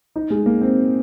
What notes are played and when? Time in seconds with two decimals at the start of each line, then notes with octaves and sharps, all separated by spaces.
0.16 D#4
0.30 G#3
0.46 A#3
0.61 C4